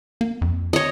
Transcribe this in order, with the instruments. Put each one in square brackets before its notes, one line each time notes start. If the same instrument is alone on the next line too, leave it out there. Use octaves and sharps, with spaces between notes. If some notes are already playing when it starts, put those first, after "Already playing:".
[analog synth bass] A#3
F2
[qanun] C#5 D#5